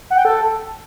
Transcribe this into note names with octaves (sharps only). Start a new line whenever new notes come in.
F#5
G5
A4